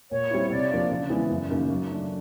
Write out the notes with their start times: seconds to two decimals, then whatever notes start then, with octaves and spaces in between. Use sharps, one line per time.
0.11 A#2 C#5
0.31 G3 C4 E4
0.50 C3 D5
0.71 F3 A#3 D4 F4
0.91 C#3
1.10 E3 G#3 B3
1.30 F#2
1.50 C#3 F#3 A#3 D#4
1.70 F#3
1.90 A3 D4